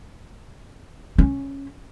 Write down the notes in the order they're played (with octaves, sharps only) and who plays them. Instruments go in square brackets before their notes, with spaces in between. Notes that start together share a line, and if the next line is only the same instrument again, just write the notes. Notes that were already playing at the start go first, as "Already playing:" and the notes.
[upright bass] C#4